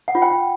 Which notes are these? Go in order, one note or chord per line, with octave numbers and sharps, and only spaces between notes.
F#5
F4
G5